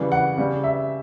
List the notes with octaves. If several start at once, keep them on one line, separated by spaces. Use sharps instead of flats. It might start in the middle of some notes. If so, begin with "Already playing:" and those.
Already playing: C#3 E3 G3
F#5
C#3 G3
E5